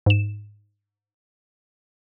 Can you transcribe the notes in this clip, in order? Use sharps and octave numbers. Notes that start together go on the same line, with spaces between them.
G#2 E7